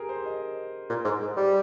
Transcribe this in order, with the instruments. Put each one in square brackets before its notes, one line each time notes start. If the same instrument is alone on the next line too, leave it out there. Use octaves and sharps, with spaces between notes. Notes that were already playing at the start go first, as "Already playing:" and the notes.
Already playing: [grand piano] G4 G#4 A#4
C5
D#5
[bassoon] A#2
G#2
G#2
G3